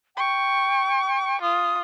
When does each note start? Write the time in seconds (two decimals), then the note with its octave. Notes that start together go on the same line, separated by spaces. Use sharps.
0.17 G5 C#6
1.42 F4 D#6